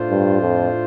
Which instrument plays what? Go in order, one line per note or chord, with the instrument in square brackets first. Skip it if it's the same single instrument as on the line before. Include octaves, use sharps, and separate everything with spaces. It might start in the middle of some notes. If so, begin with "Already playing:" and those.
Already playing: [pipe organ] A2 A3 D4 F4 C5
[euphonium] G2
F2